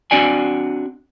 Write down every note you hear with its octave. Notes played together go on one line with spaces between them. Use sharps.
C4 D4 F#4 D5 G#5